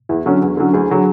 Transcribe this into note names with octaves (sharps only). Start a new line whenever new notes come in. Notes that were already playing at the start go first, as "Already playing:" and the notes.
E2 E4
D3 F#3 C#4
E2
D3 F#3 C#4
D2 G#4
D3 F#3